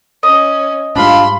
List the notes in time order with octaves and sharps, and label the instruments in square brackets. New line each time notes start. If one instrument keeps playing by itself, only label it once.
[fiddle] C#4 [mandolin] D#5
[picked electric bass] G#2 G3 [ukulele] D4 F4 F5 [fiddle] B5 C6